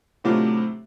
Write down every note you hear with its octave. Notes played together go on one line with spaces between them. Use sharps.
A2 C3 F#3 A3 D4 F4